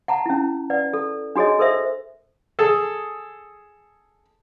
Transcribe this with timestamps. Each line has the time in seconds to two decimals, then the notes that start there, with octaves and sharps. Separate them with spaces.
0.08 F#5 A5 A#5
0.26 C#4 E4
0.70 B4 D5 F#5
0.93 A4
1.36 D4 F#4 G#4 C#5 D#5
1.59 A4 A#4 C5 E5
2.59 G#4 A4